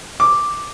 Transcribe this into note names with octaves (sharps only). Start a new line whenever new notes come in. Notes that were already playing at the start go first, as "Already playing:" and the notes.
D6